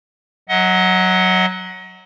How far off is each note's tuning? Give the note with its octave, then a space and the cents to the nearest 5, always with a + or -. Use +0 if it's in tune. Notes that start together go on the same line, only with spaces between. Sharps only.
F#3 +0 D#5 +30 F#5 +0